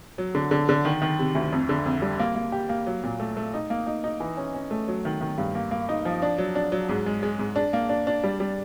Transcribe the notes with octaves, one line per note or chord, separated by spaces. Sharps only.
F#3
D3
D3
D3
D#3
D#3
C3
D2
F2
D3
F2
G3
A#3
A#3
G4
A#3
F#3
A#2
A3
A3
D#4
A#3
D#4
D#4
E3
C#4
C#4
A3
F#3
D#3
D#3
G2
A#3
A#3
D#4
F3
D4
F#3
D4
F#3
G#2
G#3
G#3
G#2
D4
A#3
D4
D4
G3
G3